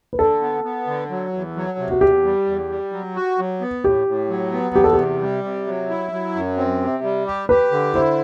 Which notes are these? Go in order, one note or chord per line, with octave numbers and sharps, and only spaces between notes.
B4
D3 A4
B3
B3
D3
F#3
E2
F#3
C3
F#4
E2 G4
G3
E2
G3
F#3
F#4
F#3
B3
A2 G4
A2
F#3
B3
E2 G4
A4
C3 G4
G3
C3
F#3
E4
F#3
F#2
C4
C3
G3
G4
G4 B4
D3
E4 C5